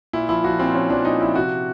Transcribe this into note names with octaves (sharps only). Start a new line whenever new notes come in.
A#2 E4
F3 E4
F3 F#4
A#2 C4
F3 C#4
F3 D4
A#2 D#4
F3 E4
C3 F#4